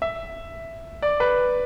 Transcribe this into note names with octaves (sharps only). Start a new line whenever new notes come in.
E5
D5
B4